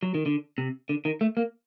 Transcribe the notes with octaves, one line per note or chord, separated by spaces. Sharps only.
F#3
D#3
D3
C3
D3
D#3
A3
A#3